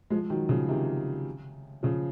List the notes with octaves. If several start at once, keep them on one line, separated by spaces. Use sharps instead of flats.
F3 G#3
D#3 F#3
C#3 F3
C3 D#3
C#3 F3